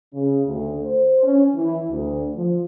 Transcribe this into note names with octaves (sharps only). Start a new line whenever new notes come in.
C#3
D2
C5
C#4
E3
D2
F3